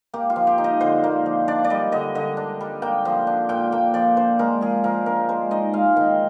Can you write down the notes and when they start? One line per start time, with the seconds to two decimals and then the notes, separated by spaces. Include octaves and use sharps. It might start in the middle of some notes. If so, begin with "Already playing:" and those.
0.13 A#3 G4
0.30 F4
0.36 F3
0.47 G4
0.58 D#4
0.64 D#5
0.81 D3 C5
1.04 A#3
1.26 F3
1.48 D4 D5
1.64 D5
1.70 G3 D#5
1.92 D3 D#5
2.15 D3 D#5
2.37 D4
2.61 G3
2.82 A#3 G5
3.05 F3
3.27 D4
3.49 A#2 G5
3.72 A#3 G5
3.94 F3 D5
4.17 D4 C5
4.39 G#3 A#4
4.61 F3 G#4
4.84 F3 A#4
5.06 D4 A#4
5.29 G#3 C5
5.51 D#4 D#5
5.74 G#3 F5
5.97 D#3 G5